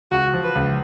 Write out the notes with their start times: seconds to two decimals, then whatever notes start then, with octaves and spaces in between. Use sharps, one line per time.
0.11 C#2 F#4
0.33 F3
0.44 B4
0.55 C#2